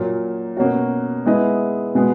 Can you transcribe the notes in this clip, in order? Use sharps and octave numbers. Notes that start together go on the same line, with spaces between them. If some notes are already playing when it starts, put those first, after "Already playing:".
Already playing: A#2 F#3 A#3
B2 A#3 C#4 F#4
G#3 B3 E4 B4 D#5
B2 G#3 B3